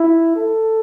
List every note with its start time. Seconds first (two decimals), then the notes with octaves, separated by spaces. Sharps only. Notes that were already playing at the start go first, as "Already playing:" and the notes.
Already playing: E4
0.36 A4